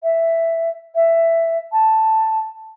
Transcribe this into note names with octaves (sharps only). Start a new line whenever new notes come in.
E5
E5
A5